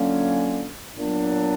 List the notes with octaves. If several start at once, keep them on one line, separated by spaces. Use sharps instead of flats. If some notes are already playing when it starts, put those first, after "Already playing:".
Already playing: D3 F#3 A#3 C#4 F4
A#2 F#3 B3 D4